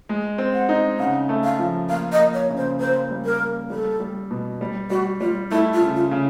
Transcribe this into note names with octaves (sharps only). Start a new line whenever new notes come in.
G#3
C4
F#5
D#4
C#3 F#5
A3
F5
F3
A#3 F5
D#5
A#3
C#5
C#3
C5
A#3 C5
G3
A#4
A#3
G3 A4
G3
B2
G3
G3 F#4
G3 F4
A3 E4
F4
C#3
F4
C#3